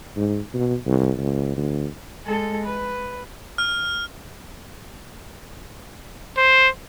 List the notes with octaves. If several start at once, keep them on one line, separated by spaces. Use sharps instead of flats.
G#2
B2
C2
C#2
D2
G#3 A4
B4
F6
C5